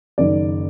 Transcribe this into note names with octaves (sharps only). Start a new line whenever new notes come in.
F#1 F#2 D#3 D5